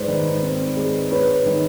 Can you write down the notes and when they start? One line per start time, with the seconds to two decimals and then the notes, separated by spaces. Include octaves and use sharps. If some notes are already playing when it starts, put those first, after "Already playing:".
Already playing: G#2 G#3 B4 C5 D5
0.08 D#3
0.43 C4
0.77 G#3
1.11 G#2 B4 C#5
1.46 D#3